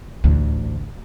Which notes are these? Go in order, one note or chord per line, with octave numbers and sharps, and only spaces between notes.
A1 D2